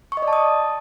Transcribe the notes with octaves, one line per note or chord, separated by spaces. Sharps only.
C#6
D#5
D5
A5
D#6